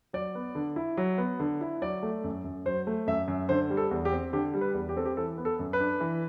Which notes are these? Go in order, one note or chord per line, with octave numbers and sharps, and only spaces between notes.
F#3 D5
B3
D3
E4
F#3
B3
D3
E4
F#3 D5
A3
F#2
F#2
F#3 C5
A3
F#2 E5
F#2
D3 C5
G3
A4
E2
G4
C4
D3 G4
G3
B4
E2
G4
C4 A4
G4
E3 A4
B3
A4
F#2
B4
D4
E3